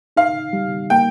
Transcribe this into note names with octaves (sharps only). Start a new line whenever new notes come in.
D#4 F5
G3
A#3 G5